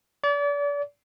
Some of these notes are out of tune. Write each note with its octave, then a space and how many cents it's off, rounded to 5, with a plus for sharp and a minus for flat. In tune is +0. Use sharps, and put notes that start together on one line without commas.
D5 -35